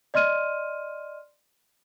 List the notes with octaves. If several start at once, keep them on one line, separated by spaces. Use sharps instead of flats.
D5 D#5 C6 F6 D#7